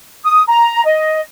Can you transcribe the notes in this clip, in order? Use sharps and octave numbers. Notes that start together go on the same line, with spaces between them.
D#6
A#5
D#5